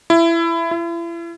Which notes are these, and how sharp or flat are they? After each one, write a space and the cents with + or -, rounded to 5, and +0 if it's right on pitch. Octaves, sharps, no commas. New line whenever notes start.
E4 +20
E4 +40